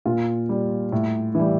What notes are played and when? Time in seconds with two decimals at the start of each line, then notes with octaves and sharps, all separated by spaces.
0.05 A#2 F4
0.49 G3
0.92 A2
1.35 E3 G3